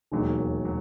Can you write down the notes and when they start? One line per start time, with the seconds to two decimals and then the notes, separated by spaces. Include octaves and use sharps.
0.12 E1 D#2 D#3 F#3
0.65 F#3